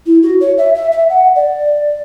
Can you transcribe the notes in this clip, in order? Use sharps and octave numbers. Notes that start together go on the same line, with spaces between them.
E4
F#4
C#5
E5
E5
E5
F#5
D5